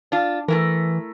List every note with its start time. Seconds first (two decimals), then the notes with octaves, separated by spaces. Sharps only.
0.12 D4 F4
0.48 E3 A3 E4 A#4